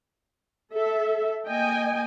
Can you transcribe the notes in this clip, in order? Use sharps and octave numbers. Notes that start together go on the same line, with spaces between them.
A4 E5
A#3 D#5 G5 G#5